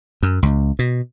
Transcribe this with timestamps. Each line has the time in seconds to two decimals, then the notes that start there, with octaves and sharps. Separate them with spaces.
0.23 F#2
0.42 C#2
0.79 B2